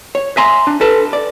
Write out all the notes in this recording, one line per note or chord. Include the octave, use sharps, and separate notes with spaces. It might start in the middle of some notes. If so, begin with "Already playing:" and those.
C#5
E5 G#5 A#5 C6
D4
A4 B4 A5
D5